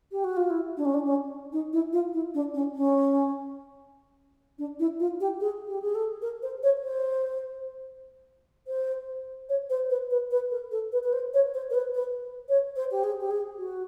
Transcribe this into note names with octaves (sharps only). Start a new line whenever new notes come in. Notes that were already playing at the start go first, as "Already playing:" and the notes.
G4
F#4
F4
E4
D4
C#4
D4
C#4
D#4
E4
F4
E4
D4
C#4
C#4
D4
E4
F4
G4
G#4
G4
G#4
A4
A#4
C5
C#5
C5
C5
C#5
C5
B4
B4
B4
A#4
A4
B4
B4
C5
C#5
C5
A#4
B4
B4
C#5
C5
G4
G#4
G4
G#4
F#4